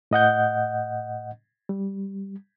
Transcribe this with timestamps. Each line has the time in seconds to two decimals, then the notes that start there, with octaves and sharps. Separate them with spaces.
0.11 A2 D#5 F#5 G6
1.69 G3